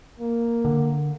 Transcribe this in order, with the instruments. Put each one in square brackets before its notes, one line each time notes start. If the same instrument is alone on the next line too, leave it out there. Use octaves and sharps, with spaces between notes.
[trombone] A#3
[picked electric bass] D3